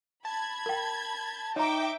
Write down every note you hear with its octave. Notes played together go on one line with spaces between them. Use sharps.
A5 B5 G#6
A#4 G5
D#4 C#5 E5 G5 A#5 D6